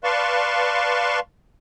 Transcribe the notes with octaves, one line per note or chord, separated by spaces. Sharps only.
B4 D5 F5 A5 C6 C#6